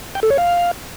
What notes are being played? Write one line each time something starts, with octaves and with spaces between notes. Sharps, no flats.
G5
A4
C#5
F5